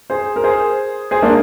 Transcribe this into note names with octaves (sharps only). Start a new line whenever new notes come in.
G#4 C5
A#4
G#4 C5
G#4 C5
A#3 D4